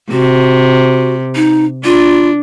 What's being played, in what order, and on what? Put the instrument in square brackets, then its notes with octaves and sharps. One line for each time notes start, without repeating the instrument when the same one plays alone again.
[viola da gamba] C3 [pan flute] F#4
[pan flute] D#4
[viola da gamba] D4 [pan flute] F4